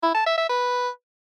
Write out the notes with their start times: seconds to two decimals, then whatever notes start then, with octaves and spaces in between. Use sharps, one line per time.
0.03 E4
0.15 A5
0.26 E5
0.38 E5
0.49 B4